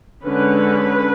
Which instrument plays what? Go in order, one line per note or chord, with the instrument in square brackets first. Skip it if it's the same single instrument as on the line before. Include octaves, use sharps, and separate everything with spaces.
[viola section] D3 G#3 C#4 B4